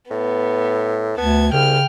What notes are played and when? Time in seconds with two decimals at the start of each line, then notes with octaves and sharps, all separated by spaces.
0.11 A2 B3
1.18 D2 B3 A5 G#6
1.52 C2 C#3 G5 F6